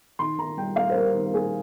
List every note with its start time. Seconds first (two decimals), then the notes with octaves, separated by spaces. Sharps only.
0.19 D#3 C6
0.38 D#3 A#5
0.57 G3 G5
0.76 A#3 F5
0.90 C5
0.95 G3 A#4
1.15 D#3
1.26 A#4
1.34 A#3 G#4